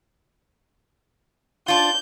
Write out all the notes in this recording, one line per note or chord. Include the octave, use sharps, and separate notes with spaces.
D4 F4 G6